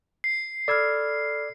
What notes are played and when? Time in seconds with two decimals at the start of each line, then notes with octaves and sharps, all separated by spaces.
0.24 C7
0.68 A4 D5 B5 E6 F6 G#6